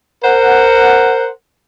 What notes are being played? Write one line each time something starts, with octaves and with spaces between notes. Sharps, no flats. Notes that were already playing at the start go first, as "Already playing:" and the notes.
A#4 C5 F#5